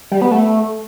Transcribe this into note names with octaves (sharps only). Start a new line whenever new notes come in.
G3
B3
A3